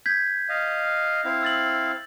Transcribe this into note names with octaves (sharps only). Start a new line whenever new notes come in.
G6 G#6 B6
D#5 F5
C4 E4 F5
E6 A6 F#7